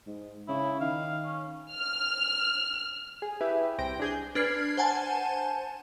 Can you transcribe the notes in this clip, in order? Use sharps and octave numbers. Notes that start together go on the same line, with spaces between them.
G#2
C#3 E4
D#3 F5
C#4
F6
G#4
E4 G4 G#4 B4 E5
C2 C5 G5 A#6 D7
D4 G#4 G6
D4 B4 F6 G#6 C7
C5 F#5 G#5 A5